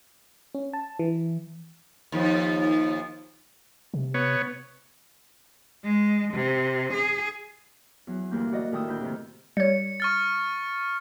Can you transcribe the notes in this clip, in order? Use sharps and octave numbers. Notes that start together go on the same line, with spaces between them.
C#4
A5
E3
D#2 F3
C3
B3 C#5
G#3
C3
G#4
E2 F#3
D2 G2 E3 A#3 G6
F#4 D5 D#5
A2 D#3 G5 D#6 E6
D2 B5 G6
C3 D#3
G3 C#5 C#7
C#6 F6 A6